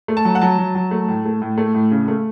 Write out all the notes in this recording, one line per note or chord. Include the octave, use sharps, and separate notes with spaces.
A3
A5
F#3
F#5
F#3 A5
F#3
F#3
A3
A2
A3
A2
A3
A2
C#3
A3